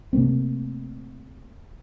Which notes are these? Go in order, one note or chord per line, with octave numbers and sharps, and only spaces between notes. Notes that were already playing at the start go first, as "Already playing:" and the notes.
C3 A3 A#3 C4